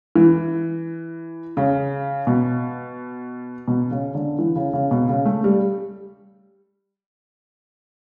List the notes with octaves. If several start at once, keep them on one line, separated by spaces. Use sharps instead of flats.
E3
C#3
B2
B2
C#3
D3
E3
C#3
C#3
B2
C#3
A3
G3